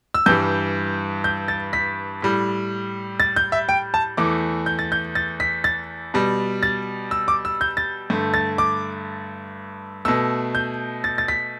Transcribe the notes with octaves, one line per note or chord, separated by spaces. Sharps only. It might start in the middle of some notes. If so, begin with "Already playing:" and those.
E6
G2 E3 G3 G6
G6
A6
B6
A2 G3
A6
G6
E5
G5
A5
E2 E3 A3 D6
G6
A6
G6
A6
B6
A6
B2 G3
A6
E6
D6
E6
G6
A6
G2 D3 A3
A6
D6
B2 A3 E6
G6
A6
A6
B6